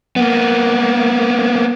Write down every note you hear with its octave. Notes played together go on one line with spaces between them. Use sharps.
A#3 B3